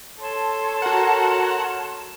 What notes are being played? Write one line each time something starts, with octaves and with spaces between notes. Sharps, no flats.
A4 C#5 A5 C6
F#4 A#4 F#5